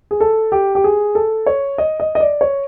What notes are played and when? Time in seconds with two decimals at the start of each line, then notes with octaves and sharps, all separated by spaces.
0.11 G#4
0.21 A4
0.52 G4
0.75 G4
0.84 G#4
1.15 A4
1.46 C#5
1.78 D#5
2.00 D#5
2.15 D#5
2.20 D5
2.41 C#5